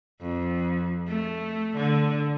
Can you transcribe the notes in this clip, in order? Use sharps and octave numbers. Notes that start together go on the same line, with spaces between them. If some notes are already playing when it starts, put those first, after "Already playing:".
F2
A3
D3